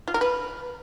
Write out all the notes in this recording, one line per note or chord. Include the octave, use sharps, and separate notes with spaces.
F4
A#4
B4